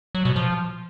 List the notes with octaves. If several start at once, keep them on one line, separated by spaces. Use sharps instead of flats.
F#3
B2
F3